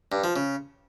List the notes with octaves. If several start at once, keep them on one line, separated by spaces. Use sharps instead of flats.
G2
F3
C#3